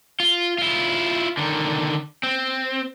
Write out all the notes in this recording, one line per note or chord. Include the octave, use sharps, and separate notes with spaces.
F4
E4 F4
D3 D#3
C4